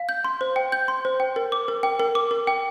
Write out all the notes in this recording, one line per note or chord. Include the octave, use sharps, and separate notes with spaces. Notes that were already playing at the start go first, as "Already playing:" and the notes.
Already playing: F5
G6
C6
C5
G5
G6
C6
C5
G5
A#4
D6
A#4
G5
A#4
D6
A#4
G5